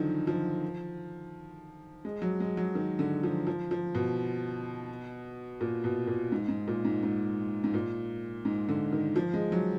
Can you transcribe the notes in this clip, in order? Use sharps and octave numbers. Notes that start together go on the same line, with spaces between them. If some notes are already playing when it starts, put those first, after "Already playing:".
Already playing: D3 D#3 F3 F#3
F3
G#3
F#3
G#3
F#3
D#3
D3
F3
F3
F3
B2
A#2
B2
A#2
G#2
G#2
A#2
G#2
G#2
G#2
A#2
G#2
D3
D#3
F3
G#3
F#3